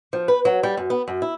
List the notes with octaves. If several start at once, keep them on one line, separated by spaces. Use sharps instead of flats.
F3
B4
F#3
G3
F#2
B3
F#2
E4